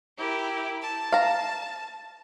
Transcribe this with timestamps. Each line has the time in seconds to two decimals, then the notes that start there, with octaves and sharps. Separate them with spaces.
0.17 E4 G4 A#4
0.82 A5
1.12 F5 A#5